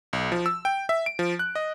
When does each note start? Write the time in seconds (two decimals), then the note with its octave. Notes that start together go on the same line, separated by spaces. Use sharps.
0.13 B1
0.32 F3
0.46 E6
0.65 G5
0.89 E5
1.06 D7
1.19 F3
1.39 F#6
1.55 D#5